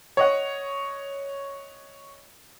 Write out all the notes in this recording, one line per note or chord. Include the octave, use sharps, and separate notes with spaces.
C#5 D#5 F#5